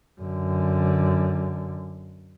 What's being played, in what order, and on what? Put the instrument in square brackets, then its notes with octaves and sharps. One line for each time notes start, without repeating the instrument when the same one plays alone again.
[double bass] F#2 D3